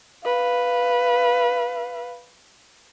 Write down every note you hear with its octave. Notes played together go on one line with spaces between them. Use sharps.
B4 F5